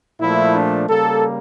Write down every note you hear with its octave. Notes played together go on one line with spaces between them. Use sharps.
A#2 F3 A3 E4
D4
C#3 G3 A#3 A4